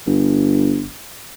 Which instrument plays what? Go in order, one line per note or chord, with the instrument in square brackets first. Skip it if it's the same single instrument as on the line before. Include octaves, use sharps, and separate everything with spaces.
[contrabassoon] G1